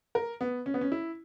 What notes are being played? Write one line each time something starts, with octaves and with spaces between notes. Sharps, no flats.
A#4
B3
C#4
B3
C#4
E4